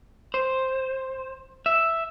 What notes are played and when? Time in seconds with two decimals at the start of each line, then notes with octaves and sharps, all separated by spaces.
0.34 C5
1.66 E5